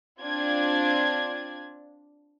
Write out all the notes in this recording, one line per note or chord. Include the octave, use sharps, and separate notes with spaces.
C4 D4 F4 D5 G#6